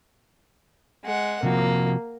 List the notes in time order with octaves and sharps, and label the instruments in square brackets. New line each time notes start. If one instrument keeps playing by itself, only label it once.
[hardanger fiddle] G#3 F#5
[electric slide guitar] C3 F3 F#4 [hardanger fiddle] A#3